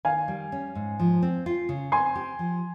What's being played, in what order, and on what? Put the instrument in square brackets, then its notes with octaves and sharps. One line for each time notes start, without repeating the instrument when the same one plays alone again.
[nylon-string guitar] D#3 [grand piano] F5 G#5
[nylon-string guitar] G3
C#4
G#2
F3
C4
F4
C#3
[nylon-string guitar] C4 [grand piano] G#5 C6
[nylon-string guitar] G4
F3